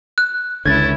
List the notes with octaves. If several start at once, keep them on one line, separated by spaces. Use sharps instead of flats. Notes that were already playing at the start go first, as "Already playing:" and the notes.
F#6
C#2 D3 C#4 E4 G#6 A6